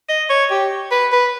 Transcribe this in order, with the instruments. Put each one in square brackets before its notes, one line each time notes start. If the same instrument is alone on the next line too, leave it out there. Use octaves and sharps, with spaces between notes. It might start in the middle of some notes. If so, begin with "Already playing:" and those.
[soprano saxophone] D#5
C#5
G4
B4
B4